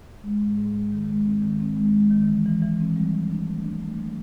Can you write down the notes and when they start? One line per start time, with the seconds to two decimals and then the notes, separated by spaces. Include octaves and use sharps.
0.23 G#3
0.40 G#2
0.58 G#2
0.75 G#3
0.92 D#3
1.09 G#3
1.26 C4
1.42 D#3
1.60 C4
1.77 G#3
1.94 G#3
2.11 D#3
2.28 E3
2.46 E3
2.62 E3
2.80 C4
2.96 G3
3.14 E3
3.31 D4
3.48 A3
3.65 D4
3.81 A3
3.99 F#3